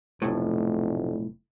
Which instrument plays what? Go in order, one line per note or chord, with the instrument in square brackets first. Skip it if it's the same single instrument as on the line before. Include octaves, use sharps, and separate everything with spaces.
[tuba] F1 [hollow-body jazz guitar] B1 A2